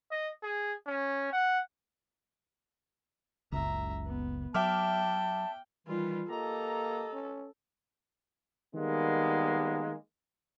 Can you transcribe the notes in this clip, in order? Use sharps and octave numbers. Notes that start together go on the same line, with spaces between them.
D#5
G#4
C#4
F#5
F#1 C#2 E5 A#5
B3
F#3 E5 G5 A5 D6 F6
D#3 E3 G3 F4
A#3 G4 A4 D#5 A#5
C#4
D#3 G3 G#3 A#3 B3